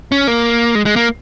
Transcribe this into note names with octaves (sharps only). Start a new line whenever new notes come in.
C#4
A#3
G#3
G#3
A#3